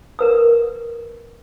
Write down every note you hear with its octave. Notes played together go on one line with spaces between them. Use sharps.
A#4 B4 E6